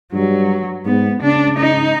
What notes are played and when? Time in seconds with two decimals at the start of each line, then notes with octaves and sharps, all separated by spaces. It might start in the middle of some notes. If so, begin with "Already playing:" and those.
0.13 G2 F#3
0.86 G#2 B3
1.22 C#3 D4
1.59 D#4